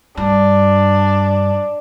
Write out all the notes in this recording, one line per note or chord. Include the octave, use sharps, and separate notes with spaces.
G2 D4